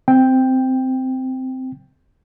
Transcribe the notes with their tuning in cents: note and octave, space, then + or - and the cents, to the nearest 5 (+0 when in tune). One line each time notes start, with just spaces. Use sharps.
C4 -10 G5 +5